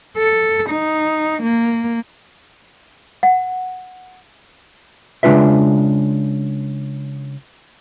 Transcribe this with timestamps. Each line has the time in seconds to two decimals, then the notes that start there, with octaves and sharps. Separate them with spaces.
0.17 A4
0.70 D#4
1.43 A#3
3.23 F#5
5.23 C#3 G#3 D4 F4 B4 E5